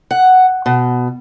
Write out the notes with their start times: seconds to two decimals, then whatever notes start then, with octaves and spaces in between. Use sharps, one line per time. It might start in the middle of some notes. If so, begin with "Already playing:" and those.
0.11 F#5
0.66 B2